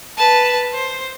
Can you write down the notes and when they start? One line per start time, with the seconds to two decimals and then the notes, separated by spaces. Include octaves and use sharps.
0.18 B4 A5
0.73 C5